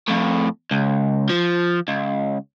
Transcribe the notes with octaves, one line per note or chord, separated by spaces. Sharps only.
F2 A2
C#2
F3
C#2